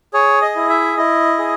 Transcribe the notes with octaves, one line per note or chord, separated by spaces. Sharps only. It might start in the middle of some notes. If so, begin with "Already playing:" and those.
G#4 C#5
D#5
E4
E5
E4 D#5
G#4